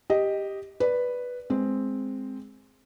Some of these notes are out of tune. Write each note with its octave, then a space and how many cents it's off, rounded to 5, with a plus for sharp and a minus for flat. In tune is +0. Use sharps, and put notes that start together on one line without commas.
G4 +0 D#5 +0
B4 +0 D5 +0
G#3 +0 C4 +0